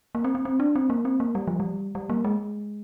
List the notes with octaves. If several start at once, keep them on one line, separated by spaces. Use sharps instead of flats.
A#3
C4
C4
C4
D4
C4
A#3
C4
A#3
G3
F3
G3
G3
A#3
G#3